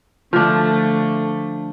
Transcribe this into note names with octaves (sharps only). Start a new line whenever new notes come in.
D3 F3 A3 D4